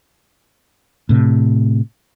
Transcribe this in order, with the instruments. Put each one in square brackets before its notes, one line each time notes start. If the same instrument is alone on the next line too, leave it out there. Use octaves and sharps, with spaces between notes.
[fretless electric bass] A2 C3